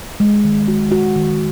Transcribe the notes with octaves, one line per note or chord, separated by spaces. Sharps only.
G#3
D#3
F#4
F#4
D#3